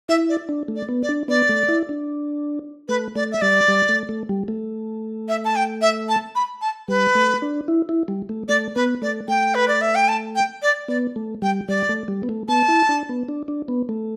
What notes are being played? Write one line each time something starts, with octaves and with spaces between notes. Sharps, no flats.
E4 E5
D5
D4
A3
D5
B3
D5
D4
B3 D5
A3
E4
D4
A3 B4
A3 D5
E5
G3 D5
G3
A3
A3
G3
A3
E5
A5
G5
E5
A5
B5
A5
G3 B4
A3
D4
E4
E4
G3
A3
A3 D5
B3 B4
A3 D5
A3 G5
B4
D5
E5
G5
A5
G5
D5
B3 D5
A3
G3 G5
G3 D5
A3
G3
B3
A3
B3 A5
E4
D4
B3
D4
D4
B3
A3